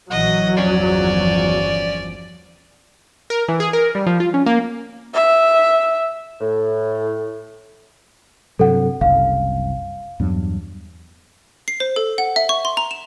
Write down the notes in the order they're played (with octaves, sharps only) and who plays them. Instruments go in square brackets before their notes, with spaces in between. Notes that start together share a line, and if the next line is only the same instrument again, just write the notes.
[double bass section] A#1 E3 [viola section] F#3 [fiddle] D#5 [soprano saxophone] F#5
[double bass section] G1 E2 F3 [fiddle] C#4 [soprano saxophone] D5
[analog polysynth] A#4
E3
G#4
A#4
G3
F3
F4
C#4
A#3
[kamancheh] E5
[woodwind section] A2
[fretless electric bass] G2 C3 F#3 [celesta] A4 F#5
[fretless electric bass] F#1 C2 [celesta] F5
[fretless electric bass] E2 G2 F#3
[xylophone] C7
C5
A4
F#5
E5
C#6
C6
A#5
E7